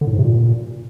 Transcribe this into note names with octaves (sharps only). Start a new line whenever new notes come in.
D3
A2
G#2
C3
A#2